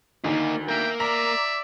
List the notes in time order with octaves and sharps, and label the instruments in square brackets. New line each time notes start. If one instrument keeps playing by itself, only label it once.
[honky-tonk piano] D2 D#3 [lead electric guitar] A#3 D#4
[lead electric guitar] A#3 A#4 [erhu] E5 [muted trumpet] G5
[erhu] D5 [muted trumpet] E5 [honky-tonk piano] A#5